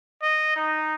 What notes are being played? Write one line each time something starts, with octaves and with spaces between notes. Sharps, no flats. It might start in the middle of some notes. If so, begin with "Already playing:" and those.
D#5
D#4